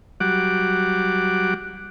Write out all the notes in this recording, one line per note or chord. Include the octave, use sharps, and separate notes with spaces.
F#3 G3 F#5 D6